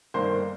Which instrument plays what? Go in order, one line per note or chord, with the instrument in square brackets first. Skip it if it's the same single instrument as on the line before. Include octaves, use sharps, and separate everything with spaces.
[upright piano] G1 G2 D#3 A#3 C5 C6